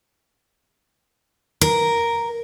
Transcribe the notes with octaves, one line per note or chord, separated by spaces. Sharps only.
A#4